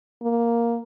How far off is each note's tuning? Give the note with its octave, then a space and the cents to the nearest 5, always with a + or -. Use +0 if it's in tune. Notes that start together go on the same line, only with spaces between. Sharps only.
A#3 +5